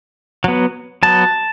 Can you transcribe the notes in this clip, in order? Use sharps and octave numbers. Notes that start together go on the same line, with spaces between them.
F#3 B3
F#3 B3 A5